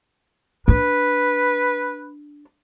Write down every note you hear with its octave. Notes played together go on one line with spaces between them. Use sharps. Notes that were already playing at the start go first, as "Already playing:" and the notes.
D4 B4